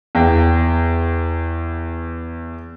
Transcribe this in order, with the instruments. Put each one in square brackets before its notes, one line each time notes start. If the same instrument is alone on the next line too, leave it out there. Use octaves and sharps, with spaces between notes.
[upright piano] E2 G5